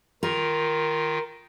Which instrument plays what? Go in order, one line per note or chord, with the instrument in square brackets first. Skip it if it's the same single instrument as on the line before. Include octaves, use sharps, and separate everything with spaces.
[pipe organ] D#3 F4 [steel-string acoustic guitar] A#4